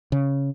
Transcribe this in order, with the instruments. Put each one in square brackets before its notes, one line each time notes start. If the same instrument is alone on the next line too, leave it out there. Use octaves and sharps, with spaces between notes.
[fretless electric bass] C#3